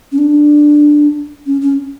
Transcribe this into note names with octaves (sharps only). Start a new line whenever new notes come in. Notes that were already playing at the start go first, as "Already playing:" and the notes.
C#4
D4
C#4
C#4